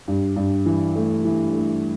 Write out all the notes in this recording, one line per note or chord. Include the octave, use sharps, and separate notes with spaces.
G2
G2
E3
A3
E3
A3